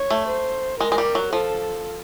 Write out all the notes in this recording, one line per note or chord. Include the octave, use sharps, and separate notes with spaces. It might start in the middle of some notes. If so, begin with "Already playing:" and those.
Already playing: C#5
A3
C5
G#3 A#4
G#3
G3
F#3
F3 A4